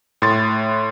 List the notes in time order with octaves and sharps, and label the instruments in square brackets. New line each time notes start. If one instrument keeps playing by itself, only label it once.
[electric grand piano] A2 C6 A6